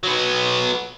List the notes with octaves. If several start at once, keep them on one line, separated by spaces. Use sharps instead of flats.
F#3 B3